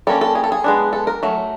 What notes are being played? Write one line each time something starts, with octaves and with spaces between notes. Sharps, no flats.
G3 A#3 C#4 A4
A4
G#4
A4
G#4
G#3 B3 D4
A4
A#4
F#3 A3